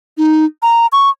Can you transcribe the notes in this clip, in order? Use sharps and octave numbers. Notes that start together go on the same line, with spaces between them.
D#4
A#5
C#6